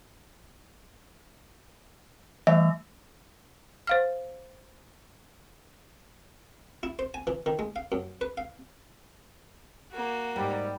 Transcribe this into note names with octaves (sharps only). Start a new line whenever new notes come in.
E3 G3 A3 E5
C5 F5 F6
E4
C5
G#5
E3
D#3
G#3
F5
F#2
B4
F5
A#3 F#4
G#2 G3